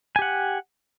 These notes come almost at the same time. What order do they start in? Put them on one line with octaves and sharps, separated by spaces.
G#5 G4 F#5